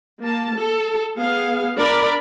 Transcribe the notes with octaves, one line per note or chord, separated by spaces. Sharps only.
A#3 A5
A4
B3 G#4 F5
D4 A#4 D5 B5